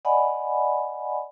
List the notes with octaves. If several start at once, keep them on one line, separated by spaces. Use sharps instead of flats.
D5 D#5 F#5 G#5 B5